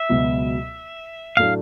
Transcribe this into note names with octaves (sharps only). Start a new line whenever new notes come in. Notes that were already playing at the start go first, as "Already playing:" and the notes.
Already playing: E5
C#2 B2 F#3 B3
A2 F#3 A3 D4 F5